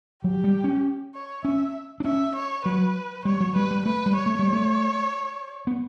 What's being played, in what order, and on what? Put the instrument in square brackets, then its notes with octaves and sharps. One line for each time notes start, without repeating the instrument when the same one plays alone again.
[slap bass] F#3 [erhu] G4
[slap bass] G3
C#4
[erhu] C#5
[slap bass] C#4 [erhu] E5
[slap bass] D4
[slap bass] C#4 [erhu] E5
[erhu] C#5
[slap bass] F#3 [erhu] B4
[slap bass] G3 [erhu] C#5
[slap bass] F#3
[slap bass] G3 [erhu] B4
[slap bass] G3
[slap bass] A3 [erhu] B4
[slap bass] G3
[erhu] C#5
[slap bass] A3
G3
A3
B3